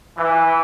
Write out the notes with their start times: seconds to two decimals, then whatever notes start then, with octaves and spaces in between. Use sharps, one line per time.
0.18 E3